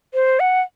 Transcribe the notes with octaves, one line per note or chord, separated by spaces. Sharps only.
C5
F#5